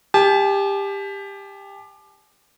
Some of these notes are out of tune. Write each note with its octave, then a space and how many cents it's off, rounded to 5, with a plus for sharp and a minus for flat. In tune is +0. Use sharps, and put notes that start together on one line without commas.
G4 +20 A5 -40